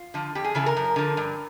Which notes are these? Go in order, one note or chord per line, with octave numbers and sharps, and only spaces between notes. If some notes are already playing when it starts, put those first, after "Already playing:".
Already playing: F4
D3 F3
F2 G4
G#4
C#3 E3 A4
A#4
F#2
D3 F3
G2